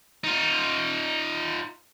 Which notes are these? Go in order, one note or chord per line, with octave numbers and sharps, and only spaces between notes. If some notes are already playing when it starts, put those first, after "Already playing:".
D#4 F4